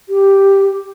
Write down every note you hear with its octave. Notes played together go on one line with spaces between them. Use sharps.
G4